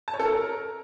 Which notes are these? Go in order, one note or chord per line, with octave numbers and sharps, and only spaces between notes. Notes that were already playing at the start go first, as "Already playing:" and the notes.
A5
C#5
A4
A#4